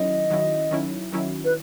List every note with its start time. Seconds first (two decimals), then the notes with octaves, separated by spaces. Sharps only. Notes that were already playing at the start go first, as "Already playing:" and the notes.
Already playing: D#3 F#3 C#4 E4 D#5
0.30 D#3 F#3 C#4 E4
0.71 D#3 F#3 C#4 E4
1.12 D#3 F#3 C#4 E4
1.45 B4